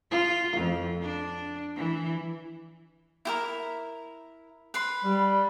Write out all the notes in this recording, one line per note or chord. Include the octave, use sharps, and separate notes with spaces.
F4
F2
D4
E3
E4 G4 A#4
B4 C6
G3